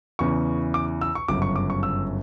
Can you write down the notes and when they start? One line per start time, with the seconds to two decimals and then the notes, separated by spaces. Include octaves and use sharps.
0.19 E2 C#3 E3 C#6
0.74 D6
1.01 E6
1.15 C#6
1.28 G1 F#2 C#3 D6
1.42 C#6
1.56 D6
1.70 C#6
1.83 E6